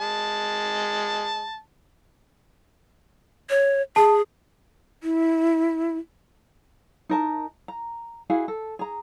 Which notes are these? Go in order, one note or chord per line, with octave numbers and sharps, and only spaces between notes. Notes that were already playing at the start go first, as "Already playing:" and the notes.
G#3 A5
C#5
G#4 A5
E4
D#4 A#4 A5
A#5
E4 F#4 G#4 F5
A4
G#4 A#5